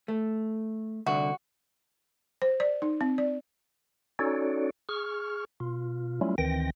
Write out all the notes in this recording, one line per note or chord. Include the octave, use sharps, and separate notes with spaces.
A3
C2 D3 F#4 E5
C5
D5
D#4
C4
D5
C#4 D#4 F#4 A4 C#5 D5
G#4 C#6 F6
B2 F4
F#3 G3 A3 C#4 E4 F4
D2 D#3 E3 C4 G5 A#6